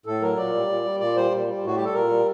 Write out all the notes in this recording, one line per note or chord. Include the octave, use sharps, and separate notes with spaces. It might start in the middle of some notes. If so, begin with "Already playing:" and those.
A2 A4
F#3 A#4
A#2 D5
G3
A#2
G3
A#2 D5
G3 C5
A#2
G3
A2 F#4
G3 G4
A4
A#2 A#4
G3